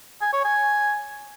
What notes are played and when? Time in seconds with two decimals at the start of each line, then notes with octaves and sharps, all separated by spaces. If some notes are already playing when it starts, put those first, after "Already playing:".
0.21 G#5
0.33 C#5
0.44 G#5